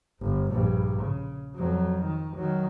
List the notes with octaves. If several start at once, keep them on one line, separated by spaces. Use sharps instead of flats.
G1
A#1 G2
C#3
F2 F#3
D#3
D#3 F#3